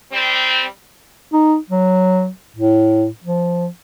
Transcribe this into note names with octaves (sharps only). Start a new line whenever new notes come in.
G3 C4
D#4
F#3
A2
F3